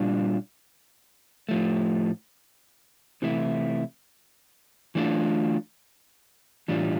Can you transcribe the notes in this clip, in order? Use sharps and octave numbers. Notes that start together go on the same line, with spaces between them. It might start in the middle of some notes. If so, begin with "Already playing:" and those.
Already playing: A#2 G3 D4 F4
A2 F3 A3
C3 E3 A3 E4
E3 A3 D4 F4
A2 E3 G3 D4 F4